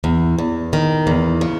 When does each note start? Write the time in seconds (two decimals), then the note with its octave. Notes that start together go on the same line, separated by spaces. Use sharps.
0.04 E2
0.38 E2
0.73 D#3
1.07 E2
1.41 C#3